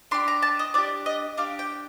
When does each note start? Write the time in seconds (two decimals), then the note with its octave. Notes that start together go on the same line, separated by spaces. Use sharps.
0.11 D4 G4 C6
0.28 A#5
0.42 A5
0.59 D#5
0.74 D4 G4 D5
1.06 D#5
1.38 D4 G4 F5
1.59 G5